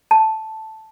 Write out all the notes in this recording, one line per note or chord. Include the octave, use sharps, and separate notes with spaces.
A5